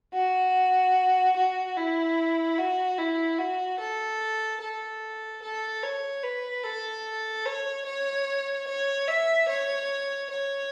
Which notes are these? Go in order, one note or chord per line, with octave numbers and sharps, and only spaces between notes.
F#4
F#4
E4
F#4
E4
F#4
A4
A4
A4
C#5
B4
A4
C#5
C#5
C#5
E5
C#5
C#5